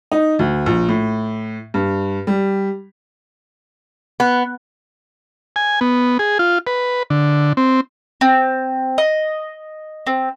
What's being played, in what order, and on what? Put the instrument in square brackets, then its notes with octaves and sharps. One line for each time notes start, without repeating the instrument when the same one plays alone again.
[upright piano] D#4
D2
A#1
A2
G2
G3
[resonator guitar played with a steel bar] B3
[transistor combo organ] G#5
B3
G#4
F4
B4
D3
C4
[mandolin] C4
D#5
C4